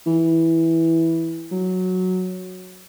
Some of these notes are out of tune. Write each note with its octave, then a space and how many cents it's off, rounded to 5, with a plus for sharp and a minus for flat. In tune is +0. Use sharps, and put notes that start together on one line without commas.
E3 -5
F#3 -5